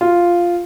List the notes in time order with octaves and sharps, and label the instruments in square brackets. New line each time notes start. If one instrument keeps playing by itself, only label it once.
[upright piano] F4